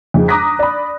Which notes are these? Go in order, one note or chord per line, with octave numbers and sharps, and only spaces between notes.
F2 G#2 G#3
A#5 D6 D#6 F#6 A#6 B6
D5 B5